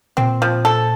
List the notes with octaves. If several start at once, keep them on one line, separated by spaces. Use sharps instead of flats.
A#2 C4
F3
A4